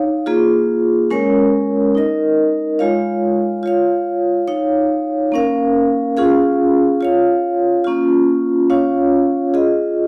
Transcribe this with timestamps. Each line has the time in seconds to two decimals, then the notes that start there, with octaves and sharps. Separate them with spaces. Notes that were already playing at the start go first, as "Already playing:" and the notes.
Already playing: D#4 C#5 F5
0.26 A#3 F4 G#4
1.10 G#3 C#4 A#4 C#5
1.95 D#4 A#4 D#5
2.79 G#3 F4 C#5 F5
3.63 F4 C#5 F5
4.48 D#4 C#5 F5
5.32 A#3 C#4 A#4 F5
6.17 C#4 F4 G#4 F5
7.01 F4 C#5 F5
7.84 A#3 C#4 F4
8.70 C#4 F4 C#5 F5
9.54 F4 G#4 D#5